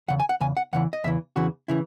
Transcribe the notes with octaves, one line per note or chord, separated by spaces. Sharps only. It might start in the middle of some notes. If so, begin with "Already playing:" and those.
E2 C#3 F#5
G#5
F#5
E2 C#3 G#5
F#5
E2 C#3 E3 F#5
D#5
E2 C#3 E3 E5
E2 C#3 E3 F#4
C#3 E3 E4